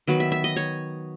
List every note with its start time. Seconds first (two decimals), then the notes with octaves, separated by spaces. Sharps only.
0.07 D#3 F#3 B3
0.20 E5
0.32 E5
0.44 D#5
0.56 C#5